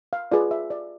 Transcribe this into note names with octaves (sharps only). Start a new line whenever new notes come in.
F5
F4 G#4 B4 D5
E5
D5